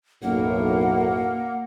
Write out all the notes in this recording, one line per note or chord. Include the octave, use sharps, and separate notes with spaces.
B1 F#2 A2 A#3 F#5